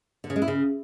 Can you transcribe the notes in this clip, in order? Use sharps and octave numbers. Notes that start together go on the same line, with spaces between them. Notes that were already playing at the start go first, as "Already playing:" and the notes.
D3
C#3
G#3
E4
C#3